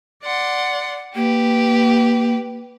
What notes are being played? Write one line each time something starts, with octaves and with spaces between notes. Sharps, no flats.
D5 F#5 C6
A#3 G4 B4